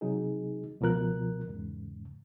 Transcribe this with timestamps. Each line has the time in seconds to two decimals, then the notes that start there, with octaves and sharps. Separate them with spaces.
0.01 C3 F#3 D#4 G#4
0.81 C#2 B2 F3 A#4 F#6
1.48 E2 G#2 C#3